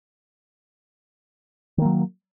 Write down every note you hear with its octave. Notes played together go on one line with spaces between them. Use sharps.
D#3 F#3 A#3